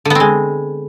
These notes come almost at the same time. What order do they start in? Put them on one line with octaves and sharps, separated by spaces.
D3 B3 C4 G#3